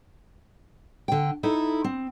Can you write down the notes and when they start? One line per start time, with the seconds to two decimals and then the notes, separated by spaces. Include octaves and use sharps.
1.08 D3 G5
1.43 D#4 E4 A4
1.84 C4